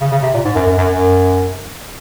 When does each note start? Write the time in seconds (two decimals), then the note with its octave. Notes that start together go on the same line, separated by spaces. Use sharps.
0.01 C#3
0.12 C#3
0.23 C3
0.34 A#2
0.45 G#2
0.55 F#2
0.67 F#2
0.77 F#2
0.88 F#2